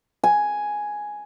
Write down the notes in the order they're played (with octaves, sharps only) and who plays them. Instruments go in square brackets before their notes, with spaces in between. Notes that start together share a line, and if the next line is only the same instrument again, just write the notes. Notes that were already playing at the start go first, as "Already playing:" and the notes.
[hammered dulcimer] G#5